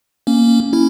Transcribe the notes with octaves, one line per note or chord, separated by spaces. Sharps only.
A#3 C#4
C#4 E4